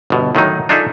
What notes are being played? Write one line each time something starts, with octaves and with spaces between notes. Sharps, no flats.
G1 B2
A2 D#3 F#3 D#4
D4 D#4 F4 G#4 A4 E5